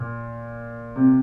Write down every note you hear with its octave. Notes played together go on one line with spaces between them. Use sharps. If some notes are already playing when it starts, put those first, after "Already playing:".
Already playing: A#2
C3